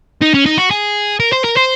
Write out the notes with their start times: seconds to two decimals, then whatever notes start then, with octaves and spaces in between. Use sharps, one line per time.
0.22 D#4
0.34 C#4
0.46 D#4
0.58 F#4
0.71 G#4
1.20 A#4
1.33 C5
1.44 A#4
1.57 C5